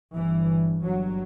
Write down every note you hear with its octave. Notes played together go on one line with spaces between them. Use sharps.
G1 G2 E3
G1 G2 F#3